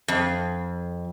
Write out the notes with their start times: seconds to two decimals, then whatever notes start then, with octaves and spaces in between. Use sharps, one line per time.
0.08 F2